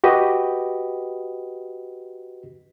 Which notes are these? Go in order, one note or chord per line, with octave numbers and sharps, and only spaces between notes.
F#4 G4 B4 D#5